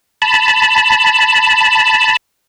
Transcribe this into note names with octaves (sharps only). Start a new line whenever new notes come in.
A5 B5